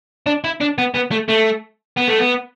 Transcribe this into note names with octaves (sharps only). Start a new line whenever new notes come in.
D4
E4
D4
B3
B3
A3
A3
B3
A3
B3